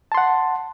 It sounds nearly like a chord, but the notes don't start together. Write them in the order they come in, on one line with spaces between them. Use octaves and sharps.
A5 C6 F#5